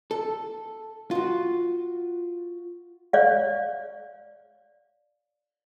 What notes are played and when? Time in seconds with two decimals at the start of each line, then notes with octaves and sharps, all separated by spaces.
0.11 A4
1.11 F4 F#4
3.13 C#5 D5 F5